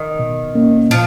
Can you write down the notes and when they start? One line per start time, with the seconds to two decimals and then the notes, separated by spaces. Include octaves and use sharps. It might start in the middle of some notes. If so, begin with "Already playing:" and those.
Already playing: D#3
0.19 B2
0.55 A#3 C#4
0.90 A#2 F3